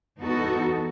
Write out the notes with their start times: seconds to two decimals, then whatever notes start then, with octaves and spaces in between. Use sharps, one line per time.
0.21 E2 B3 D#4 F#4 A4